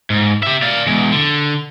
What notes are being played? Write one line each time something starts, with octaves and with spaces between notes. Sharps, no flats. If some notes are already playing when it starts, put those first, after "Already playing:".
G#2
G4 E5
D5 F5
E2 G#3
D3